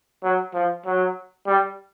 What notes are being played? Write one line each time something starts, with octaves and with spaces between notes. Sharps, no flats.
F#3
F3
F#3
G3